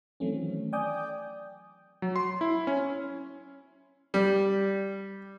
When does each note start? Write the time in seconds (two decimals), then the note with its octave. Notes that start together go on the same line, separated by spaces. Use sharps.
0.20 D#3 E3 F#3 A3 C4 C#4
0.73 D5 G5 G#5 D6 D#6 G6
2.02 F#3
2.16 C6
2.41 E4
2.67 C#4
4.14 G3